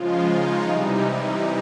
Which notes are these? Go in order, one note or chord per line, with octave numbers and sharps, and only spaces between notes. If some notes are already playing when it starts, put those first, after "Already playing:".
Already playing: C#3 F3 G#3 F4
D#4
C3 E3 G3